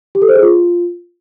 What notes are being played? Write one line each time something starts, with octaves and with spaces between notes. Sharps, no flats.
G4
A4
C5
G#4
F4